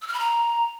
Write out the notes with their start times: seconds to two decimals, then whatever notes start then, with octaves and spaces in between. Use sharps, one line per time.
0.02 E6
0.08 F6
0.13 B5
0.19 A#5